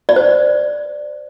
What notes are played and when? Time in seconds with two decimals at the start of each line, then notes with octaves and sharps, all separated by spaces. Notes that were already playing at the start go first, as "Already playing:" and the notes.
0.09 D5
0.16 C5